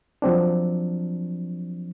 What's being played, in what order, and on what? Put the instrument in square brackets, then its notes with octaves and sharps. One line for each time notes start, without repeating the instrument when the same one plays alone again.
[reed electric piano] F3 F#3 C4 D4